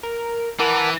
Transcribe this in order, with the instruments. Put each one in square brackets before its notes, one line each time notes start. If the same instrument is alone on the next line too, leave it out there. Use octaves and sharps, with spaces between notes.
[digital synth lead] A#4
[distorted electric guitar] E3 [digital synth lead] A#4 [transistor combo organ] F#5 A5 D6